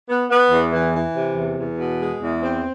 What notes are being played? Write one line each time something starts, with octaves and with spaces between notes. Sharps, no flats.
B3
B3
E2
E3
E3
C3
E2
E2
B2
G#3
E2
C4